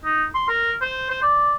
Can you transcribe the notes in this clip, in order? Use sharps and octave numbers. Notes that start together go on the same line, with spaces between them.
D#4
C6
A#4
C5
C5
D5